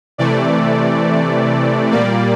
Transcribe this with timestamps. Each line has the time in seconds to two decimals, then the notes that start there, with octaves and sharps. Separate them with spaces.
0.18 C3 E3 A3 D5
1.92 A#2 G3 A#3 D5